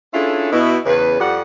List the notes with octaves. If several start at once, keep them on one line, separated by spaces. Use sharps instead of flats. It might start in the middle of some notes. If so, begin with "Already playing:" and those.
C#4 D4 E4 F4 G#4 A4
B2 E4
E2 C#3 B4
F2 G3 F#5